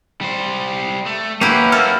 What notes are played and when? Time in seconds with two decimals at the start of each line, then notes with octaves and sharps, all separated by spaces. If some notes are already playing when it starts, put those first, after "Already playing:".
0.21 G3 C5
1.06 A3
1.41 A#3 C#4 E4 F#4 G4 B4
1.72 A#3 A4 E6 F6